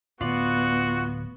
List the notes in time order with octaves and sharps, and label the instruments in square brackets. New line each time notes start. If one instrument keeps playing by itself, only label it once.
[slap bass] D1 [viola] B3 [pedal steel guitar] F4 D5 [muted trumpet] F#4